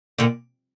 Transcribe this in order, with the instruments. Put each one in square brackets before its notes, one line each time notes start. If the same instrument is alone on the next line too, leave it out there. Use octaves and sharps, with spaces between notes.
[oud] A#2 D3